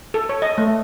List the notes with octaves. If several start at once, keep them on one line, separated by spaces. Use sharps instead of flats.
A4
C#5
D#5
A3